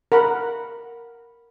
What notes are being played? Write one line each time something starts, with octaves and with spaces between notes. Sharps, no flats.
A#4 F#5 B5